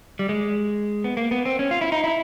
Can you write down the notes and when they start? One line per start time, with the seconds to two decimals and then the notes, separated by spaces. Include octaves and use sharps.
0.19 G3
0.29 G#3
1.04 B3
1.17 A#3
1.31 B3
1.45 C4
1.59 C#4
1.71 F4
1.81 E4
1.92 D#4
2.04 E4